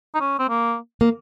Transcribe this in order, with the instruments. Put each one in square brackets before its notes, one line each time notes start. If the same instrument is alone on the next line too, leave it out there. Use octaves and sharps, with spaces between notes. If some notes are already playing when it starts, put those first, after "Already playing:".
[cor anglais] D#4
C#4
C4
A#3
[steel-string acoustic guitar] A#3